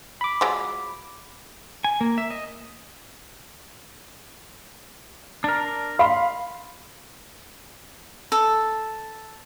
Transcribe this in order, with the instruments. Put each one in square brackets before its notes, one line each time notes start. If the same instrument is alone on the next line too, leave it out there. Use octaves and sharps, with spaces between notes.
[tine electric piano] B5 D6
[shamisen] F3 F#3 G#3
[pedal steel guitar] G#5
A#3
E5
D#5
[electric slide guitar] D4 A#4
[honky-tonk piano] F5 [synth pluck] B5 C6
[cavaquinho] A4